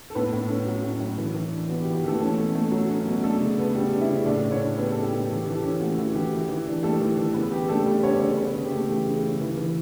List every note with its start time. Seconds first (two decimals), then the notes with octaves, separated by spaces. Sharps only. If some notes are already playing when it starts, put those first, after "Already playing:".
0.10 A4
0.15 A2 B3 B4
0.33 A2
0.49 C#4
0.66 F#3
0.83 A2
1.00 A2
1.18 E3
1.34 E3
1.52 D4
1.69 B3 F#4
1.81 G4
1.86 E3
1.94 G4
2.04 E3 A3 A4
2.20 A3 C#4 A4
2.38 B2
2.55 A3
2.71 F#3
2.89 C#4
3.06 B2
3.23 A3 D4 A4
3.41 C#3
3.58 B3
3.75 G3
3.92 D4
4.00 E4 E5
4.09 C#3
4.26 A2 D4 D5
4.44 A2
4.52 C#4 C#5
4.60 D4
4.78 G3 B3 B4
4.92 A2 A4
5.03 G4
5.12 A2
5.29 E3 G4
5.46 E3 A4
5.55 G4
5.63 C#4
5.80 A3 F#4
5.98 E3 F#4
6.15 E3 G4
6.32 E3
6.48 E3
6.66 D4
6.83 G3 A3 A4
7.00 E3
7.18 E3
7.34 C#3 B3 B4
7.52 C#3 G4
7.68 A3 D4 A4
7.86 G3 B3 B4
8.03 C#3 C#4 C#5
8.14 D5
8.20 C#3 C#4 C#5
8.37 C#3 B3 B4
8.55 C#3
8.63 G4
8.72 A3
8.89 E3 G4
9.06 C#3
9.23 C#3
9.41 E3
9.57 E3